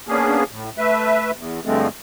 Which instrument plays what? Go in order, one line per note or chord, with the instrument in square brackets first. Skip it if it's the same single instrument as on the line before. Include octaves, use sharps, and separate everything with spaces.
[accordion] A#3 B3 C#4 D4 G#4
A2
A3 B4 E5
E2
G2 D3 F3 G#3 A3 C4